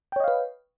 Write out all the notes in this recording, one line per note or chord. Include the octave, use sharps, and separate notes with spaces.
B4 C#5 D#5 F5 G5